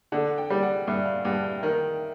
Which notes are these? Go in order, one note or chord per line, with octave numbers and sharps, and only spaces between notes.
D3 F#5
G5
G3
F#5
G2 E5
F5
G2 F#5
G5
D#3